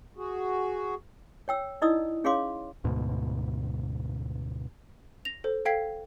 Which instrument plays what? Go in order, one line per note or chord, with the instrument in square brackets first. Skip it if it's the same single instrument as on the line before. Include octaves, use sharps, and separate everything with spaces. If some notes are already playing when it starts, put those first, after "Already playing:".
[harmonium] F#4 G#4
[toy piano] C#5 G5 E6
D#4 E4 D5 D#5 D#6 E6
C#4 G#4 C#5 F5 C6 D6
[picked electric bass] D2 G#2 B2
[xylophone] A#6 F7
A4 C5
A4 F5 G5 G#6 B6 C7